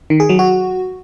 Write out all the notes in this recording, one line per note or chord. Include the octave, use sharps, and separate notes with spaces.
D#3
G#4
F#3
F#4